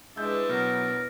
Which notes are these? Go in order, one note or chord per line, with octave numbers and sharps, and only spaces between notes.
G#3 D4 E4 B4 E5 G6
B2 F#3 A#4